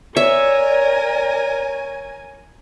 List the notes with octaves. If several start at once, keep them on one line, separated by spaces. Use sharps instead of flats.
A#4 C#5 D5 E5 G#5